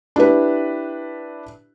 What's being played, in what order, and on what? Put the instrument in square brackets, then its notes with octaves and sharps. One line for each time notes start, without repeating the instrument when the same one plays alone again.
[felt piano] D4 E4 G4 B4